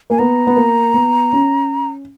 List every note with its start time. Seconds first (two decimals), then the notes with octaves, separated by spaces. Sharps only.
0.10 A#3 G#5
0.19 B3 A#5
0.47 B3
0.56 A#3
0.94 B3
1.33 C#4